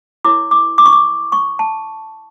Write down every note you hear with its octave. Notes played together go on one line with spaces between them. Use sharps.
E4 A#4 C#5 D6
D6
D6
C#6
D6
C#6
A5